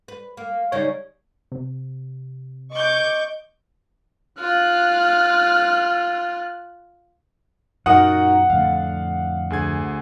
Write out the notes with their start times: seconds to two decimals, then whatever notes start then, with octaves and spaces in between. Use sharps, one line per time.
0.08 B4
0.37 A#3
0.72 C#3 G3 D#4 C#5
1.52 C3
2.72 D#5 C#6 D6 G6
4.39 F4 F6 F#6
7.86 F#2 A#2 D#4 F#4 A#4 F#5 D#6
8.50 F2 A2 D3 F5
9.50 D2 G#4 G#6